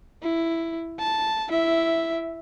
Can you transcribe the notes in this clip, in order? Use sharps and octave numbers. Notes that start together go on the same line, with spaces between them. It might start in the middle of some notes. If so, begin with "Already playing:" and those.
E4
A5
E4 E5